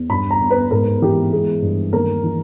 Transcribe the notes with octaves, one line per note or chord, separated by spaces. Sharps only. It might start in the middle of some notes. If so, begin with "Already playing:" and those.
Already playing: E2
G2 B5
A#5
G1
B4
G#2 A#4
E3 G4
G#3 G#4
G2
D#2 A#4
E3